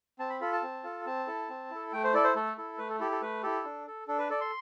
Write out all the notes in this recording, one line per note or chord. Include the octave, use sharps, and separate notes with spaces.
C4 A5
B5
F4 A4 B5
A5
C4
F4 A4
C4 A5
E4 A4
C4
E4 A4
A3 G5
C5
E4 A4 D5
C5
A3 A4
E4 A4
A3 B4
A4
E4 G4 A4
A4
A3 B4
E4 G4 A4
D4
A4
D4 A4
B4
A4 D5
C6